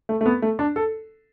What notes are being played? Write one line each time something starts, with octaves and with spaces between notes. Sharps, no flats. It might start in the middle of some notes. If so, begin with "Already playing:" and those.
A3
A3
B3
A3
D4
A4